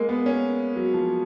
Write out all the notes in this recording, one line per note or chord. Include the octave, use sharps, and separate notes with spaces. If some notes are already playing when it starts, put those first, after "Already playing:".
Already playing: G#3 A#3 A#4
B3
C#4
F#3
F3